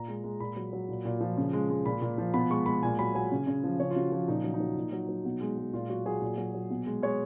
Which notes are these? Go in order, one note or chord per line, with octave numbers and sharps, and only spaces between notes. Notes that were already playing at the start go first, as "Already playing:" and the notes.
Already playing: A#2 A#5
G#3
G#3
A#2 B5
F#3
F#3
A#2
A#2
F3
C#3
G#3
G#3
A#2 B5
A#2
F3
B2 B5
G#3 C#6
G#3 B5
A#2 G#5
F#3 B5
F#3 G#5
C#3
C#3
F3
C#3 C#5
F4
C#3 F#4
F3 F4
A#2 D#4
F#3
D#4
F#3
A#2
F#3
F#3
B2
G#3
G#3
A#2 F4
F#3 F#4
F#3 G#4
A#2
F#3
F#3
B2
G#3
G#3 C#5